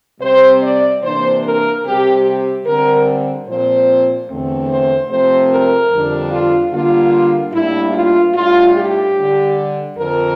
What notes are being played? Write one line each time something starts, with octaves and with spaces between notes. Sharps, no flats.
C3 G3 C4 C5
D5
C3 E3 A#3 D4 C5
A#4
C3 G3 C4 G4
G4
D3 G3 C4 A#4
A#2 F3 C4 C5
E2 D3 A3 C4
C5
C3 F3 A3 C4 C5
A#4
F2 D3 G3 D4
F4
D3 G3 A#3 D4 F4
A2 G3 A#3 D4 E4
F4
A2 G3 D4 F4
G4
D3 G3 D4
F2 D3 F3 A#4